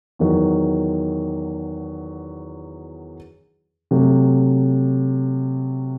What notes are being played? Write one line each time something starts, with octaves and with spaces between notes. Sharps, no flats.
E2 D#3 F#3
C3 F#3 A3